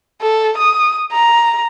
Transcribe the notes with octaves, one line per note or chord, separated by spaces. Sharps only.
A4
D#6
A#5